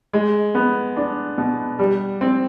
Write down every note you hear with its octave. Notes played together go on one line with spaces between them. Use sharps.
G#3
B3
D4
B2
G3
C4